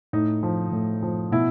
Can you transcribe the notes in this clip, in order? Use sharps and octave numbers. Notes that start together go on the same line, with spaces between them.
A2 D#4
F3
A2
F3
B2 E4